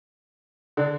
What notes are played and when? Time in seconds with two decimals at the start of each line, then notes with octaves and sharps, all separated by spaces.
0.77 D3 D4